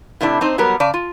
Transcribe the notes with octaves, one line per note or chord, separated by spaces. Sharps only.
A2 C3 F#3 D4 E4
C4 D#4 C5
F#3 G3 B3 A#4
C#3 D5 A5
F4